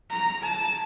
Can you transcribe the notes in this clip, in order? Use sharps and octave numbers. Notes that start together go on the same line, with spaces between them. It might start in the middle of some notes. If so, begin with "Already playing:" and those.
A#5
A5